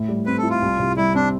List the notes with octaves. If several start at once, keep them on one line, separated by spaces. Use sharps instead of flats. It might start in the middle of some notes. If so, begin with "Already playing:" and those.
Already playing: A2
G3
C4 B4
A4
E4
F4
C2
C3
G3 E4
C4 D4